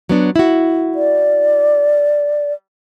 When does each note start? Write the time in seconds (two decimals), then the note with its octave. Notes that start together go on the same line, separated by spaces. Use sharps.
0.09 F#3 B3 D4
0.36 E4 F#4
0.95 D5